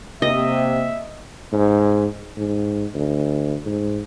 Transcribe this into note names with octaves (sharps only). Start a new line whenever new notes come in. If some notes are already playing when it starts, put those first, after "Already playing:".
C3 A#3 D#5 E5
G#2
G#2
D2
G#2